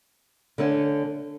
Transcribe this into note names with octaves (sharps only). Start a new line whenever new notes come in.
D3 A3 C#4